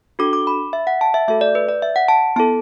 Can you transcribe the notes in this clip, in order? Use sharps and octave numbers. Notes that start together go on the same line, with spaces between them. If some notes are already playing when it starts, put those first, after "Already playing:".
D4 F#4 A4 D6
D6
B5
E5
F#5
A5
E5
A3 F#4 A4 E5
D5
B4
D5
E5
F#5
A5
B3 E4 A4 A5